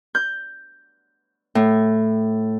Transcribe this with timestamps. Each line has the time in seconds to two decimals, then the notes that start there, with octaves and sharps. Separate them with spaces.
0.15 G6
1.55 A2